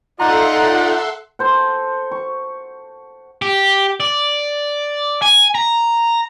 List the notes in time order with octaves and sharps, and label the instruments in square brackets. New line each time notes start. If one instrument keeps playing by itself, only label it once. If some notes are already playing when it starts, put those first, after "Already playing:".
[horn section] D#4 F4 D5 [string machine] A4 E5 C6 [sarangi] F#5 [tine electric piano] A#5
[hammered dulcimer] A4 C5 F#5
C#6
[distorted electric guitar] G4
D5
G#5
A#5